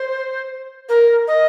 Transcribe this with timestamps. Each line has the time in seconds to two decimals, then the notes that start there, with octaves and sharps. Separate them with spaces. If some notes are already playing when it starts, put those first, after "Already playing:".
Already playing: C5
0.89 A#4
1.28 D#5